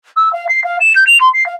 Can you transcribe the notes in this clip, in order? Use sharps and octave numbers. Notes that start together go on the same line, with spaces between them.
E6
F5
C7
F5
E7
G6
F7
C6
C7
F5